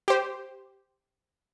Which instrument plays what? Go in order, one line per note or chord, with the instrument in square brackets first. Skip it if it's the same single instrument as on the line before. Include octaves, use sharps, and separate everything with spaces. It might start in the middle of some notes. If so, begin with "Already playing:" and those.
[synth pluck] G4 C5